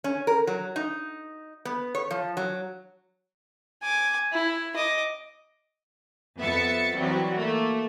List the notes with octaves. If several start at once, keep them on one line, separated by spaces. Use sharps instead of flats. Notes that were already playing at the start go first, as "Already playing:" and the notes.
C#4
A#4
F#3
D#4
B3
C#5
F3
F#3
G#5 D6
E4
D#5 D6
F2 B3 E5 A6 C#7
E3 F#3 G3 C4 F#4
A3 A#3